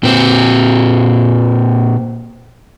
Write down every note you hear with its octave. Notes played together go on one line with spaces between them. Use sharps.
A#2 C4